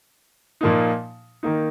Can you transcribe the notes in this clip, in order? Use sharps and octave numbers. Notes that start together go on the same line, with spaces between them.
A#2 F3 A#3 D#4
D#3 A#3 D#4